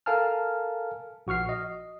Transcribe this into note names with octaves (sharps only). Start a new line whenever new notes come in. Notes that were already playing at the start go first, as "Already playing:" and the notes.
A4 A#4 F5 G#5 A5 F6
A#1 F#4 C#6 F6 C7
D#5